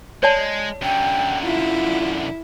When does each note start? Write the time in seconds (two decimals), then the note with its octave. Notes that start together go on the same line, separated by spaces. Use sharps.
0.23 G#3 C#5 D5 A5
0.82 F#2 D3 G5
1.44 E4 F4